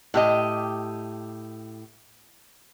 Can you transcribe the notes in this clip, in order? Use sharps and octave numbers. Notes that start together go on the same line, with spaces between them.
A2 G4 D#5